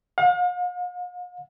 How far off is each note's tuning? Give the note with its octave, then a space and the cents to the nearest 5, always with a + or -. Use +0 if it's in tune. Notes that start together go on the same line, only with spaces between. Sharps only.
F5 +45